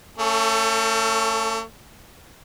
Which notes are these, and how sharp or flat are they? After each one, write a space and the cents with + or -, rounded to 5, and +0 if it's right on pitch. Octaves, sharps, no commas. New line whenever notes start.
A3 +40 C#4 +0 A4 +0